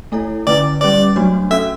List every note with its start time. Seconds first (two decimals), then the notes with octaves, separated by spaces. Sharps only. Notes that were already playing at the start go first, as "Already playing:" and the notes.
0.12 A3 E4 A4 C#5
0.47 D3 A3 C#4 E4 B4 D5
0.81 G3 C#4 G4 B4 D5
1.16 F#3 A3 D4 F#4 C#5
1.51 C#4 F#4 A4 E5